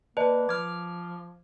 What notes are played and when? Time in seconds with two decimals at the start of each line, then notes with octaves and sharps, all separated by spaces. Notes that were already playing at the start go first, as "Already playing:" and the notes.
0.17 A#3 B4 D5 D#5 A5
0.49 F3 D6 F6 G#6